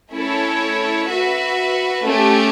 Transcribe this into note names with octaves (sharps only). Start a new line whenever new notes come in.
A3 C#4 E4 A4 C#5
F#4 B4 E5
A3 C#4 G4